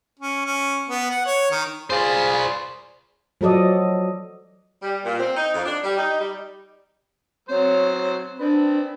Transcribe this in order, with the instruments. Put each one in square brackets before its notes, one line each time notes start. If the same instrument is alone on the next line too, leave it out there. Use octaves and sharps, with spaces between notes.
[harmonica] C#4
C#4
B3
F#5
C#5
D#3
[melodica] F4 G#4 [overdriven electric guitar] C5 D5
[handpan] F3 F#3 A4 D5 D#5
[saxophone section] G3
A#2
C4
D#4
F2
D4
G3
D#4
G3
[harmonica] F#3 C5 [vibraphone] C4 [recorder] C#5
[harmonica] C4 B5 [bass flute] D4 [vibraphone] B4 [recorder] D5